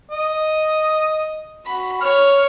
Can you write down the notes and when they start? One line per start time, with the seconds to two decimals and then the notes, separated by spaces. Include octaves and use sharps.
0.11 D#5
1.66 F#4 B5
2.01 C#5 F6